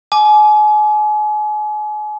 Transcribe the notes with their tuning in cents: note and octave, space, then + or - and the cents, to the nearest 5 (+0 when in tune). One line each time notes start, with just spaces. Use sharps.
G#5 +35 D6 +0